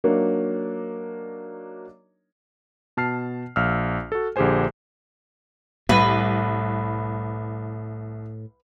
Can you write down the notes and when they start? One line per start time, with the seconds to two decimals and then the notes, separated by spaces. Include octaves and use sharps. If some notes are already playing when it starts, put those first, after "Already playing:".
0.04 F#3 A#3 D4 D#4 A#4 C#5
2.97 B2 A5 F6 C7
3.56 A#1 F5 E6 F6
4.12 F#4 A4
4.36 A#1 D3 G4 G#4 C5 G#5
5.89 C2 A2 B4